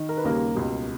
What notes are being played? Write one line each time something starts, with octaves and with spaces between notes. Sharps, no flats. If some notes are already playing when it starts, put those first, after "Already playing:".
Already playing: D#3
A#4
B4
D#2 C#3 G3 A#3 A#4
C#2 B2 G3